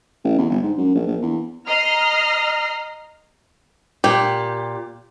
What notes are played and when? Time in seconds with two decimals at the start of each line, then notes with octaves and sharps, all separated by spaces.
0.24 A1
0.38 E2
0.50 G1
0.62 G#2
0.78 F#2
0.95 A#1
1.07 A#1
1.22 E2
1.67 D#5 A#5 F6 C7
4.04 A#2 G4